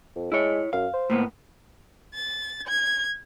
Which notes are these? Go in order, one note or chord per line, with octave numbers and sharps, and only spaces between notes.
F2
G#3 E4 C#5
F#2 F5
C5
A2 A#3 B3
A6
G#6